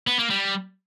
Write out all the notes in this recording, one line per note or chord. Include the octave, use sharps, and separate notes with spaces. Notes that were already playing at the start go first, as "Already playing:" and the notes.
B3
A#3
G3